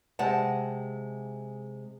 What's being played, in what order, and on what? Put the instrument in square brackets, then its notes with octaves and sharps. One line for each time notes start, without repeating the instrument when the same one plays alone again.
[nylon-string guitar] C3 G#3 G4 F#5 A5